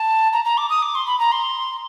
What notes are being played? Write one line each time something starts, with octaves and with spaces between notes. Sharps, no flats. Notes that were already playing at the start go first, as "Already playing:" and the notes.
Already playing: A5
A#5
A#5
D6
D#6
D6
C6
B5
A#5
C6